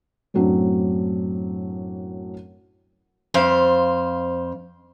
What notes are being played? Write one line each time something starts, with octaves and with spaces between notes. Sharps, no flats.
F#2 A2 F#3 C4 D4
F2 C5 F5